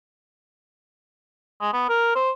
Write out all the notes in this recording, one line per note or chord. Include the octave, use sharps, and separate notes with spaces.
G#3
B3
A#4
C5